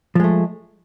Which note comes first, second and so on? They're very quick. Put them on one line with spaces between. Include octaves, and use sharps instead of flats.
F3 G#3 A3